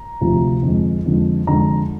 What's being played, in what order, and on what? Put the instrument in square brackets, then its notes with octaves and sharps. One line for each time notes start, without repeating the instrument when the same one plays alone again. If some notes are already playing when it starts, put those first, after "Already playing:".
Already playing: [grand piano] A#5
D2 C3 F3
F2 D3 G#3
F2 D3 G#3
F2 D3 G#3 A#5